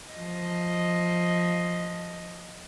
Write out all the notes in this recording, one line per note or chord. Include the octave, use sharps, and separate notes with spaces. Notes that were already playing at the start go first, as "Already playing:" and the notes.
F3 D#5